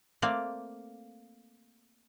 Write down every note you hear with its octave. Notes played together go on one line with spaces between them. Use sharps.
A3 A#3 C4 D5 F5